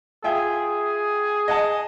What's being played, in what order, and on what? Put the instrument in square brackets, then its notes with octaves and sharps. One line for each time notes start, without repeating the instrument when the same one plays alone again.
[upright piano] F4 E5 G5 [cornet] G#4
[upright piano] D#5 F#5 A5